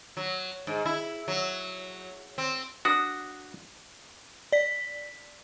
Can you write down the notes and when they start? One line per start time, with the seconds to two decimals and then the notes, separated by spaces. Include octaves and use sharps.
0.17 F#3
0.67 G#2
0.86 E4
1.28 F#3
2.38 C4
2.85 D4 F#4 D#6
4.52 D5 B6